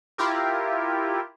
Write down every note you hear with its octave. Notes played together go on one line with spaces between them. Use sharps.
E4 F4 G4 A#4